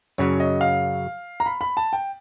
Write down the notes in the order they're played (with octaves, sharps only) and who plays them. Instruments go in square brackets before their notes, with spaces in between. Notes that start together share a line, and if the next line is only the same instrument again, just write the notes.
[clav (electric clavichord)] F#2 C#3 F#3 [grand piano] C#5
[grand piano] D#5
F5
A#5
B5
B5
A5
G5